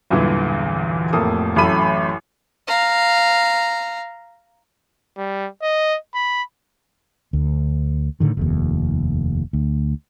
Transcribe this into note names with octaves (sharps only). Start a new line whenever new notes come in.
B1 E2 G2 A#2 D3 E3
F1 A2 A#3 A4 D#6
A1 F#2 A2 A4 B5 D#7
F5 A#5
G3
D#5
B5
D2
A2 D3 D#3
F1 D#2
D2